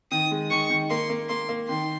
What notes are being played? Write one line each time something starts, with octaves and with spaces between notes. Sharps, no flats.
D#3 D#6
G#3
D#3 C#6
D#3
A#3 C6
A#3
A#3 C6
A#3
D#3 C6